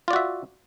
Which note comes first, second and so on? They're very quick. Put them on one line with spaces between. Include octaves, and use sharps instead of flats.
F4 D5 F#4 E5